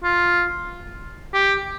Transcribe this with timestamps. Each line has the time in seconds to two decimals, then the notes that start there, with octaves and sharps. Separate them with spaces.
0.04 F4
1.34 G4